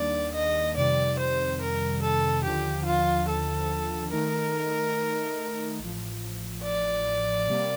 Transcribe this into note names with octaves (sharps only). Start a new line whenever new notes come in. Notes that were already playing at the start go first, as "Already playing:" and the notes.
Already playing: D#2 D#3 G3 A#3 D4 D5
D#5
F2 C3 D#3 G3 D5
C5
A#4
A4
D#2 D3 F3 G4
F4
A4
D#3 A3 D#4 A#4
A1 A2 F3
D5
C3 G3 A#3